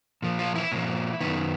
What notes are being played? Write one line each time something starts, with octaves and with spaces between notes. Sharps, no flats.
A#2 F3
F4
E4
A#2 F3
F#2 D#3 B3